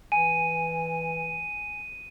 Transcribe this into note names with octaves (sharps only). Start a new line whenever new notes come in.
E3 G#5 D#7